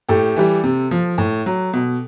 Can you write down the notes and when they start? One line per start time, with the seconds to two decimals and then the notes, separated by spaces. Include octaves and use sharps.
0.09 A2 G4 A4
0.36 E3 G3
0.63 C3
0.91 F3
1.18 A2
1.46 F#3
1.73 B2